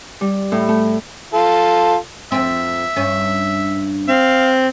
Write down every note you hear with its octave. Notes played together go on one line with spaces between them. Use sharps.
G3
A2
A3
F4 A4
F2 C4 E5
G2 C#4
C4 F5